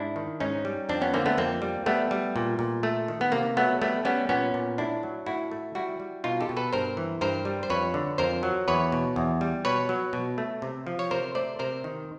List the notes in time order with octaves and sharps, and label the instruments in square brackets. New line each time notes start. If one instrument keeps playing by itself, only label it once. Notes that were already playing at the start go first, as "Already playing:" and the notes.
Already playing: [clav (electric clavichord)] G#2 D4 E4
D#3
G#2 C#4 D#4
G3
F2 C4 D4
B3 C#4
D3 A#3 C4
A3 B3
F2 A#3 C4
G3
G3 A3 B3
G3
A#2
A#2
A3
D#3
B3
C3 A#3
F#3 A3 B3
G3 A3 B3
G3 B3 C#4
A#2 B3 C#4
A#2
A2 D4 E4
F#3
A2 E4 F#4
A3
G3 E4 F#4
G3
B2 D#4 F4
G4 A4
B2
A4 B4
G2 A#4 C5
E3
G2 A#4 C5
G3
C5
F2 B4 C#5
D3
F2 A#4 C5
F#3
E2 B4 C#5
B2
E2
G3
B2 B4 C#5
F#3
B2
A3
C3
F3
C#5
C3 A#4 C5
A3 C5 D5
C3 A#4 C5
D#3